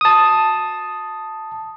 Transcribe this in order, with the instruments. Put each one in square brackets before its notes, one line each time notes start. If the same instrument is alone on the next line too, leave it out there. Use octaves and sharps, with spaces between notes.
[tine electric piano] A5 D#6